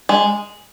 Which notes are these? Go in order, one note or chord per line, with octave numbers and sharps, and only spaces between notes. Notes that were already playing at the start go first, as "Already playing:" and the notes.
G#3